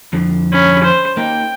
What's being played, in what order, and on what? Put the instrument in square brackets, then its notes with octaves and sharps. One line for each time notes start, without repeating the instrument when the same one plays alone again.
[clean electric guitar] F2 D3 F3
[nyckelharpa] C#4 B5
C5
[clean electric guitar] A#3 D#4 [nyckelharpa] G5